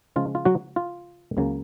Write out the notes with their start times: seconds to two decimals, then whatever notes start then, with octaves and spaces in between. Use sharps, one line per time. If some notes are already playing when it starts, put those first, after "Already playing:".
0.16 C#3 F3 G#3 C#4 F4
0.35 F4
0.45 F#3 F#4
0.76 F4
1.37 C#2 C#3 F#3 A#3